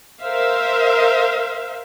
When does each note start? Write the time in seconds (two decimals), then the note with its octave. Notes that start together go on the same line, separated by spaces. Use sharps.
0.22 A#4 C5 E5 F5